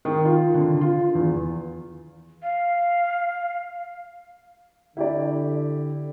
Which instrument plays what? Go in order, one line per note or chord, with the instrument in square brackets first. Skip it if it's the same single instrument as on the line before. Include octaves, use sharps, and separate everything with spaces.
[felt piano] D#3
F4
D3
F4
E2
[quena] F5
[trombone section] D3 [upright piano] E4 G4 D5